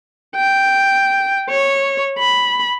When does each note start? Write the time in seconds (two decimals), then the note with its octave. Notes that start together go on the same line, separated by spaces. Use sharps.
0.36 G5
1.49 C#5
2.18 B5